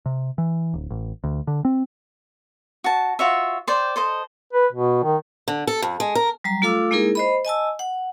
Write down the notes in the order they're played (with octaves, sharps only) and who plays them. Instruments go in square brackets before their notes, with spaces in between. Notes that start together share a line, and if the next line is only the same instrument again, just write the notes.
[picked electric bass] C3
E3
D1
A1
D2
D3
C4
[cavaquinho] F#4 A5
F4 F#4 C#5 E5
C5 D5 G5
A4 C5 D#5
[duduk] B4
B2
D#3
[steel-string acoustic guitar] D3
A4
F2
G#3
A#4
[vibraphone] F#3 G3 A#5
A3 F4 A4 F5 D6 E6
G#3 A#3 D#4 E4 G#4 A#4
C5 D#5 B5
D#5 G#5 A5 E6
F#5